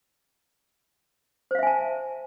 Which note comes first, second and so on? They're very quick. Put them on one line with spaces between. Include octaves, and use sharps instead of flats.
C5 F5 E5 G#5 A5